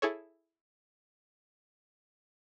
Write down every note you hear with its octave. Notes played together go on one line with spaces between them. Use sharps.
E4 G#4 A4 C#5